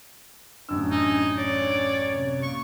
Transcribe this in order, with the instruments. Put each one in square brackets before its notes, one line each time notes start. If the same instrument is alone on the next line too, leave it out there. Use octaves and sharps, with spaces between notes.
[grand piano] A1 F#2 E6 [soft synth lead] D4
[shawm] D#4 [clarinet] G#5
[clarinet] C#5 [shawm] D5
[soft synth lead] D7
C3
[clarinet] A#3 [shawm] C#6